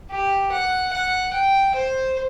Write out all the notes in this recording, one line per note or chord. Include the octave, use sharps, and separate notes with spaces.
G4
F#5
F#5
G5
C5